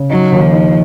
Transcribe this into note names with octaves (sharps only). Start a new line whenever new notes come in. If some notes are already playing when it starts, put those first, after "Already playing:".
Already playing: C#3
F#3 D#4
D#2
F3
D#4